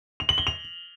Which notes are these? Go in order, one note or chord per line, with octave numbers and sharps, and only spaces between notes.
F7
F#7
G7
F7